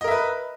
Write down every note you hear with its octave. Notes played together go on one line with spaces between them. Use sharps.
A#4 B4 D#5 E5